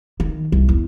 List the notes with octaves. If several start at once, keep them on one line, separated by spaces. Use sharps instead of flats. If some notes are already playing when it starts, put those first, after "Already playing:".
D#3
C2
E2